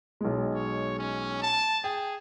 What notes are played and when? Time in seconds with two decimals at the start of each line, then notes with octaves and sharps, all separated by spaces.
0.21 B1 G#3
0.55 C#5
0.99 C#4
1.42 A5
1.84 G#4 G5